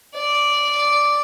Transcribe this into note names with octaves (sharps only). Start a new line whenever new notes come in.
D5